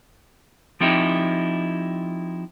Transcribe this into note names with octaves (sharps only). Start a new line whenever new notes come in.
F3 C4 D#4 E4 G4